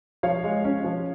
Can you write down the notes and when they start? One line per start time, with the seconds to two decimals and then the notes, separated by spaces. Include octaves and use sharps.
0.23 F3 C#5 F5
0.44 G#3
0.64 C#4
0.84 F3